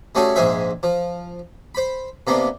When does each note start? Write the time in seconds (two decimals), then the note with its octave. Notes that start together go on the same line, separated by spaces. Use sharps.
0.15 G3 A3 C#4 F#4 G#4 A4
0.36 A#1 G#2 G#4 C5 E5
0.83 F3
1.75 C5 B5
2.27 C3 A#3 B3 D4